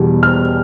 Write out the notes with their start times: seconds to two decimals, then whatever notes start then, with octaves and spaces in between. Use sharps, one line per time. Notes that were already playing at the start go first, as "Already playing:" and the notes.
Already playing: E2 B2 G3
0.23 F6